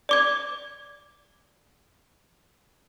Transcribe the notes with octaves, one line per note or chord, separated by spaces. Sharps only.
D5 D6 G#6